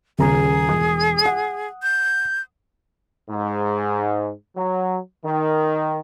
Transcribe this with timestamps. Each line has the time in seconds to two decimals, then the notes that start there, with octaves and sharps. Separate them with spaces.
0.19 D#1 C#3 G#4 A#5
0.69 E1 D#6
1.25 F#5
1.83 G6
3.29 G#2
4.56 F#3
5.24 D#3